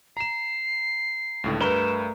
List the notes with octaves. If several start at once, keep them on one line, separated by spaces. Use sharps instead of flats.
A#5 C7 E7
C#2 A2 D3
G2 A3 A#4 B4 E7 G7